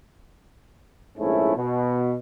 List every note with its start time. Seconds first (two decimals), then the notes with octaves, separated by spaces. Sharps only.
1.18 A#1 G#2 A3 C#4 E4
1.56 B2